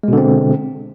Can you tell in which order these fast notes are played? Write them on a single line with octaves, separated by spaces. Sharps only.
G#3 B2 D3 C4